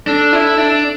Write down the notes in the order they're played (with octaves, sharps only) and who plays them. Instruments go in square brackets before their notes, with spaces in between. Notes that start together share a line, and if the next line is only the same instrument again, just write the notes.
[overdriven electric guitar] D4 [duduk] A4
[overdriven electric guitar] E4
D4